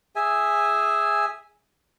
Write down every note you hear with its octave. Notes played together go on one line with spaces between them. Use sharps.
G#4 E5 G#5